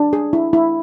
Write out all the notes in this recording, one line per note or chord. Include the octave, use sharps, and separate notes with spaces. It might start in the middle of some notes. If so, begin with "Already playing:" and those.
Already playing: D4
G#4
E4
E4